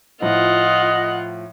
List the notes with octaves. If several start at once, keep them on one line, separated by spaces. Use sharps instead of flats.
A2 F3 F4 D#5 F#5